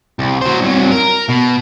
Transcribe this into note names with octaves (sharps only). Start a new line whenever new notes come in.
C2
F#3 C5
C2 F#3
A#4
B2